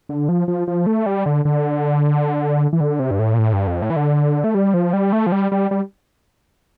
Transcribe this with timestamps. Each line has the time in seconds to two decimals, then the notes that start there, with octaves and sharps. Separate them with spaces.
0.09 D3
0.29 F3
0.48 F3
0.67 F3
0.86 A3
1.06 G3
1.26 D3
1.45 D3
2.73 E3
2.80 D3
2.99 C3
3.11 G2
3.19 A2
3.34 A#2
3.39 A2
3.53 G2
3.67 F2
3.82 A2
3.90 E3
3.96 D3
4.44 A3
4.55 G3
4.74 F3
4.93 G3
5.13 A3
5.27 F3
5.32 G3
5.52 G3
5.71 G3